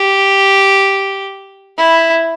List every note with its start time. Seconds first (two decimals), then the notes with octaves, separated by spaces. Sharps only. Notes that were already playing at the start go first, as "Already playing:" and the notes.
Already playing: G4
1.77 E4